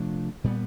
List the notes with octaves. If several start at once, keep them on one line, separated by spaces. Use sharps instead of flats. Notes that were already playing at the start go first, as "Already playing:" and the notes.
Already playing: C3 F3 A3 D4
A#2 G3 B3